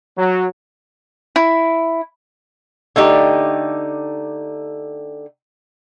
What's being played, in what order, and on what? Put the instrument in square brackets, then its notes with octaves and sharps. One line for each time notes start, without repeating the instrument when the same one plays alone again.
[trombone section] F#3
[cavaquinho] E4
[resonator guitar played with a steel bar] D3 A3 D#4 G4